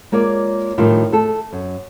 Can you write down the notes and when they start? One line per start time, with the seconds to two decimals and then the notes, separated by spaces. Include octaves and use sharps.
0.12 G#3 A#3 F4 C#5 D5
0.78 A2 D#3 F3 G3 D4 F4
1.12 A3 A4
1.52 F#2